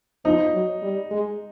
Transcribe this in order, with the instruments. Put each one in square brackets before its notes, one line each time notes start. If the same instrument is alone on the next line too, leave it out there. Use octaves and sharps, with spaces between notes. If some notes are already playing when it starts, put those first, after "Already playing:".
[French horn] F3 [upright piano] D#4
[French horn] F#3
G3
G#3